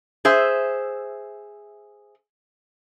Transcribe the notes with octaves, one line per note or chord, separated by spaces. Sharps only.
G#4 C5 E5